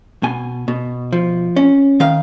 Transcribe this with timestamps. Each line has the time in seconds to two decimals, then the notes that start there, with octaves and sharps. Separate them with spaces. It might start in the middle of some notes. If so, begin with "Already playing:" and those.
0.23 B2 G#5
0.68 B2
1.12 F3
1.56 C#4
2.00 D#3 F5